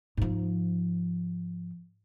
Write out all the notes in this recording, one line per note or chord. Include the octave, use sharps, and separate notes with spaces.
G#2 F3